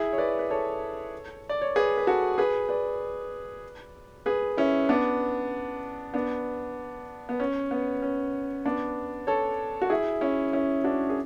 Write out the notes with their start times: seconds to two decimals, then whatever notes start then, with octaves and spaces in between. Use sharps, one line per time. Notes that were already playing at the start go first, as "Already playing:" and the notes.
Already playing: E4 G#4
0.13 C#5
0.18 B4 D5
0.39 B4
0.51 A4 C#5
1.49 D5
1.61 C#5
1.76 G#4 B4
1.97 B4
2.07 F#4 A4
2.38 G#4 B4
2.69 B4 D5
4.26 G#4 B4
4.57 C#4 E4
4.89 B3 D4
6.14 B3 D4
7.29 B3
7.40 C#4
7.71 B3
8.02 C#4
8.66 B3 D4
9.27 A4 C#5
9.82 F#4
9.90 E4 G#4
10.21 C#4 E4
10.53 C#4 E4
10.84 D4 F#4
11.10 G#4